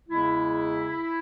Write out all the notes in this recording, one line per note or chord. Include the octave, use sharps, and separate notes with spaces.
E2 C#3 G#3 E4